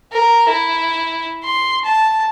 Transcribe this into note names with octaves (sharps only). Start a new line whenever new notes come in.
A#4
E4
C6
A5